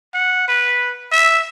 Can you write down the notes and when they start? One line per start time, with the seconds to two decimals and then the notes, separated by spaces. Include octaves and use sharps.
0.14 F#5
0.48 B4
1.12 E5